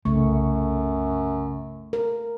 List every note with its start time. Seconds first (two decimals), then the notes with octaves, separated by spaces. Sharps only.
0.05 C2 F#2 C#3 A3 C#6
1.93 A#4